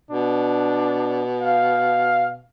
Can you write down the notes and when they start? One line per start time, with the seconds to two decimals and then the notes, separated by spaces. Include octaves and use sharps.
0.11 B2 D4
1.41 F5